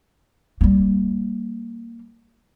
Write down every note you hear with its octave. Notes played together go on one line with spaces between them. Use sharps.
G3 A#3